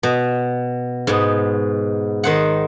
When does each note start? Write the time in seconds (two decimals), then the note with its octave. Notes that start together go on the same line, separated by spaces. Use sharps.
0.03 B2
1.07 G#2 B3
2.24 D#3 C5 F#5